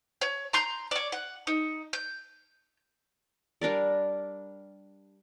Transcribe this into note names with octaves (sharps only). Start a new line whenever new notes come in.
C#5
A#5 C6 G6
C#5 D5
F#5
D#4
G6
G3 D4 A#4 D5